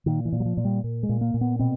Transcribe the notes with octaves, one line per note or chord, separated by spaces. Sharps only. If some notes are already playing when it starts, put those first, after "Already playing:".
A#2 D#3
E3
A#2
F#3
F3
A#2
G3
A#2
G#3
A#2
A#3
A#2
B3
B2 C4